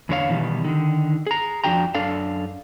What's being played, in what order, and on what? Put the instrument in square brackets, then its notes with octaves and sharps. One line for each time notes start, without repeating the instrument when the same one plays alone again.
[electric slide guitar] E2 D3 C#5 F5
B2 D#3 E3 G3
D3 D#3
G#4 A#5
F2 F3 D4 F#4 G5 A#5
F#2 D4 A4 F5